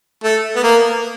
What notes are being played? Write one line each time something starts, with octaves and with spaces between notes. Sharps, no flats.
A3
B3
A#3